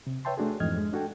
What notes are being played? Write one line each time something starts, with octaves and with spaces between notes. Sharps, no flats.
C3
B4 C#5 E5 G5 A5 C6
A3 D4 F#4 G#4
F2 G#2 E3 D#5 F6 G#6
G#3
D4 F#4 A4 G5